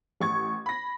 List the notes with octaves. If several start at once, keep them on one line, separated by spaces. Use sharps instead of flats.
A1 C#6 G#6
B5 A#6